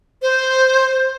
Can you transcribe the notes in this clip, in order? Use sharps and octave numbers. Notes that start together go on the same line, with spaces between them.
C5